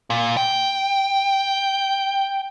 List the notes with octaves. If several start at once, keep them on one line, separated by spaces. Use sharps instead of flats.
A#2
G5